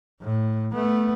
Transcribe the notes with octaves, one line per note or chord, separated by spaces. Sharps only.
A2
A3 B3